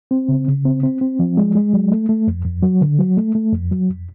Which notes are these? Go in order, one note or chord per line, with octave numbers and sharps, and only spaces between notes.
C4
C#3
C#3
C4
C4
C4
F3
G#3
G#3
F#3
A3
A3
F2
F2
F#3
D3
F#3
A3
A3
F2
F#3
F2